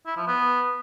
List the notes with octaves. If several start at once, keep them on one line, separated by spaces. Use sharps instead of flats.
E4
F3
B3